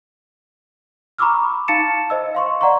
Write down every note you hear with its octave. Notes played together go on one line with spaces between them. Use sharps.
A#5 B5 C#6 D6 E6 F6
D#4 F5 A5 A6 C#7 E7
C5 D#5 E6
F5 C6 C#6
D5 F#5 A#5 C6 C#6